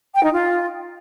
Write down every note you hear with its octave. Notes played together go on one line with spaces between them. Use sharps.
G5
D#4
F4